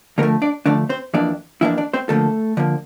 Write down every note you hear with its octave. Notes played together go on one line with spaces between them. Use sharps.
D3 F3 A3 A#3 A#4
D4 D5
D3 F3 A3 D4 D5
C4 C5
F2 E3 A#3 D4 D5
F2 E3 A#3 D4 E4 E5
D4 D5
C4 C5
D3 F3 A3 A#3 A4
D3 F3 A#3